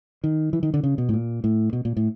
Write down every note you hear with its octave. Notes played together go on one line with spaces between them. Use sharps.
D#3
E3
D#3
D3
C#3
B2
A2
A#2
A2
B2
A#2
A2